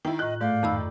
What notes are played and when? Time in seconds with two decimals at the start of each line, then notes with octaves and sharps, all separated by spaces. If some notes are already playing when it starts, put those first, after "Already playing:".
0.05 D#3 E4 G5
0.19 A2 F4 D#5 F#6
0.41 G#2 A3 D5 F5 G6
0.63 F2 D#3 B5 E6